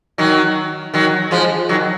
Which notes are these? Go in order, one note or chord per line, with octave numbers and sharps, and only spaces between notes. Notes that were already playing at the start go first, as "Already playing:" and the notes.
D#3 F#3
D#3 F#3
F3 G#3
D#3 F#3